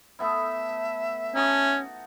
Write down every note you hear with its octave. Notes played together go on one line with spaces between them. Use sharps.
A3 B3 E4 E5
C#4 D#4 F#4 A5